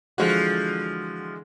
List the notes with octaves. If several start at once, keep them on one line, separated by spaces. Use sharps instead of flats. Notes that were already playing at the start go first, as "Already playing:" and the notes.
D3 E3 F3 G#3 F#4